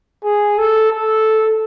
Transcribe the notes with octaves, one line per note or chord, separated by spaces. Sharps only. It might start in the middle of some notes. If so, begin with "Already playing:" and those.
G#4
A4
A4